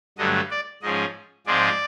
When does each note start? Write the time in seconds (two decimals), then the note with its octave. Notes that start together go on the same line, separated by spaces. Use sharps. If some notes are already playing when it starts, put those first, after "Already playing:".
0.18 G2 D3 F#3 A3 D#5
0.51 D5
0.82 G#2 F3 G#3 C#4 D#5
1.46 G#2 F3 G#3 C4 D5